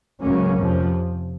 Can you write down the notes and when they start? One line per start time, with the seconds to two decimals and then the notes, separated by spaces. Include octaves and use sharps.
0.21 C#2 C#3 F#3 A#3 C#4
0.56 F2 C3 F3